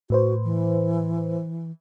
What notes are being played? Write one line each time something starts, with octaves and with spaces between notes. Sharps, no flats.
A2 F#4 B4 C5
E3